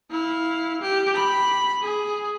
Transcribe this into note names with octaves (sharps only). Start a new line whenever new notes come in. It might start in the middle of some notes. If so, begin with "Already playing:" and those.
E4 F5
G4
B5
G#4